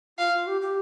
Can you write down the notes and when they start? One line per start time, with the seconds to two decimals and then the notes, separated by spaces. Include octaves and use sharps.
0.18 F4 F5
0.33 F4
0.47 G4
0.61 G4